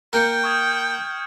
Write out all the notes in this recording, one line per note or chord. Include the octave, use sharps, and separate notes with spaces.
A#3 A#4 G5 F6 G6 C#7
C#6 D#6 G#6